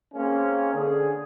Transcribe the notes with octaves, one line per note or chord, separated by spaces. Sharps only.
G#3 A#3 C4 C#4
D3 G#4